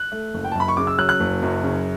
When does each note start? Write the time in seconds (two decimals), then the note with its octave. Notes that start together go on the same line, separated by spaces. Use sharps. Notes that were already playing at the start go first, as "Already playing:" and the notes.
Already playing: F#6
0.12 A3
0.34 F#1
0.44 G5
0.52 A5
0.55 F#2 B5
0.68 C#6
0.77 C#3 D6
0.87 E6
0.98 F#3 F#6
1.09 F#6
1.20 F#1
1.42 F#2
1.63 C#3